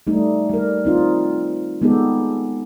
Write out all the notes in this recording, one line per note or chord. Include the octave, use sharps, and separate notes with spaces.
G3 A3 D#4
G3 A#4
C4 D#4 F4
G#3 B3 D#4 G4 A4